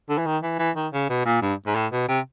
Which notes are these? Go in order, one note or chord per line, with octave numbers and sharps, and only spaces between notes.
D3
E3
D#3
E3
E3
D#3
C#3
B2
A#2
G2
G#2
A2
B2
C3